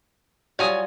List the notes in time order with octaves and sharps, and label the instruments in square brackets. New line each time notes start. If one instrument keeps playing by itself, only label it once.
[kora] F#3 G3 F4 [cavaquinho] C#5 G#5 D#6